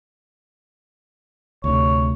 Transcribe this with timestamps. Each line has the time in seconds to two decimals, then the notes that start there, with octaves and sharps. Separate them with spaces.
1.64 D2 C3 C#5